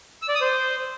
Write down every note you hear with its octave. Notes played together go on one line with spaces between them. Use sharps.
E6
D5
D#6
C5